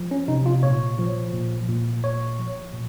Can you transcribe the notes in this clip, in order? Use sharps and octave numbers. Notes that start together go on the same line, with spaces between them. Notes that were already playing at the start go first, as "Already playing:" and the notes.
Already playing: F3
C#4
C3 D#4
F4
A#2 C#5
F3
A#2
A#2
A#2 C#5
F3
A#2